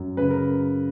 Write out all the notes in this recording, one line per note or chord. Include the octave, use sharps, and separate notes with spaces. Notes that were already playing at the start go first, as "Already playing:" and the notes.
Already playing: F#2
C#3 B4
A#4